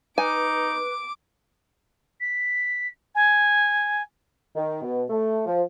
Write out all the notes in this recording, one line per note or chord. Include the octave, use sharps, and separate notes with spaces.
D#4 B4 G#5 D6
B6
G#5
D#3
B2
A3
F3